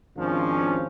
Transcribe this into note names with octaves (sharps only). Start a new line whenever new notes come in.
G#1 F3 C#4 D4 F4